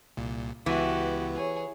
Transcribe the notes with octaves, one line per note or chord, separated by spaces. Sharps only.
C2 A#2
C#2 E3 B3 F#4 G4
G#4 C#5